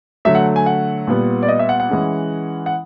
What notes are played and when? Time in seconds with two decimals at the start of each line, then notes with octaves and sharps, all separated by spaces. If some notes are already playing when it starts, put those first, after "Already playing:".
0.25 D3 F#3 A3 E5
0.35 F#5
0.56 G#5
0.66 F#5
1.07 A#2 G3 B3
1.43 D5
1.48 D#5
1.59 E5
1.69 F#5
1.80 F#5
1.90 E3 G#3 C#4
2.66 F#5